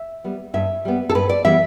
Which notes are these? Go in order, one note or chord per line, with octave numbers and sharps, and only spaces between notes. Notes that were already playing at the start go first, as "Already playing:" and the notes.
Already playing: E5
G3 B3
G2 E5
G3 B3
A4
G2 B4
D5
E3 G3 B3 E5